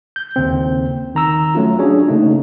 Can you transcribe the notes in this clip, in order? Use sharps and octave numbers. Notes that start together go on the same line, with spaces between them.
G6
D#2 C#3 C4
D#3 A#5 E6
F#3 A3 C#4 F4
C#4 D4 F#4 G#4 C#5
C#3 A3 A#3 D#4